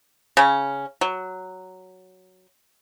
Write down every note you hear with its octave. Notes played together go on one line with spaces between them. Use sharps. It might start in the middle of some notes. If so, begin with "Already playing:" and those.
C#3 C#4
F#3